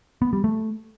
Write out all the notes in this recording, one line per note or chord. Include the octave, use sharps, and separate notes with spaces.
B3
G3
A3